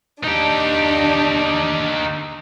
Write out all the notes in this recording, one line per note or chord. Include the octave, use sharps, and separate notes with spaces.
D4 D#4 G4